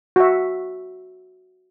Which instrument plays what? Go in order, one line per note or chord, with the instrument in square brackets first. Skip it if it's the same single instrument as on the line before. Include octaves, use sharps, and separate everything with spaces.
[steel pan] F#4 E5